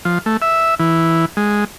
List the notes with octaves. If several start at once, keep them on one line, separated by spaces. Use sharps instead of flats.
F3
A3
E5
E3
G#3